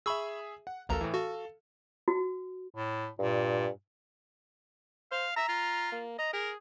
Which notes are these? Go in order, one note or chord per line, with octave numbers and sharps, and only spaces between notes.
G#4 E5 B5 C#6 E6
F#5
A1 D2 A4 A#4 F5 A#5
A2 E3
F#4 A4 F5
F#4
A2
G2 A#2
C5 F5
E5 A#5
F4
A#3
D#5 A#5
G#4 A#4